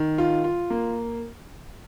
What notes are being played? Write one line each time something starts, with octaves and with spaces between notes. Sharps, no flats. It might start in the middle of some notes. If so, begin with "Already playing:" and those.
Already playing: D#3
F4
F4
A#3